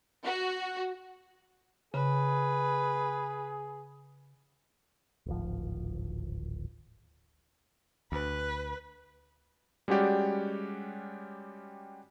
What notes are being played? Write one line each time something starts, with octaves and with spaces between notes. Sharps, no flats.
F#4
C#3 G#4 B4
D1 G#1 F3
D2 B4
G3 G#3 C#4 F#4 G4 D5